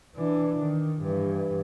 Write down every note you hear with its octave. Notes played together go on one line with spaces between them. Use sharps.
E3 D4
D#3
G2 E3